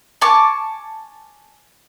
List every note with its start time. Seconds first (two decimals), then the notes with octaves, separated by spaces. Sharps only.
0.21 G#5 A5 C#6 D6